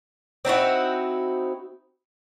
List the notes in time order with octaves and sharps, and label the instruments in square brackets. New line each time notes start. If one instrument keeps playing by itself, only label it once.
[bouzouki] C4 D#4 E4 F#4